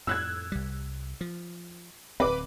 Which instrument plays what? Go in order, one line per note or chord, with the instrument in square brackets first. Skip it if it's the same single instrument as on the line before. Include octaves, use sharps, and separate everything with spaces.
[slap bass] F2 A2 [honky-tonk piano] E6 F#6 G#6
[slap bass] C2 G3
F3
[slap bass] D1 C4 [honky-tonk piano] B4 D6